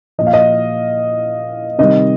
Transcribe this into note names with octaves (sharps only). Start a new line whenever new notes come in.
A#2 F3 D#5
F5
D#5
C3 D#3 G3 D#5